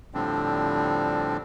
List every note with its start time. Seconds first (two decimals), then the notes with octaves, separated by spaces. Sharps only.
0.14 A2 D3 F3 G3 C4 D4